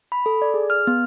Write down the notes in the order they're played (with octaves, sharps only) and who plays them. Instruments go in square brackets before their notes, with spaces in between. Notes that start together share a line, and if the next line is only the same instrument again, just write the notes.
[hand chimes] B5
A4
D5
G#4
F6
B3